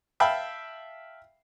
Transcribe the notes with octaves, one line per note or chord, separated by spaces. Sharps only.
E5 F5 G5 A5 B5